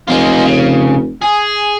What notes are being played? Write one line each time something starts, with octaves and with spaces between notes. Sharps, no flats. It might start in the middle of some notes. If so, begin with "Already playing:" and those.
F1 G#3 F4
C#3
G#4